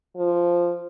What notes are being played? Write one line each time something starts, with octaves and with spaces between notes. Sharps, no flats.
F3